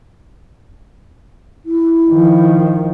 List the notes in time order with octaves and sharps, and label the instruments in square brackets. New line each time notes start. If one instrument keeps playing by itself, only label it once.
[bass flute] E4
[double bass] D#3 F3